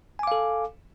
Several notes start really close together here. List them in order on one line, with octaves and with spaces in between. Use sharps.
G#5 D6 F5 A4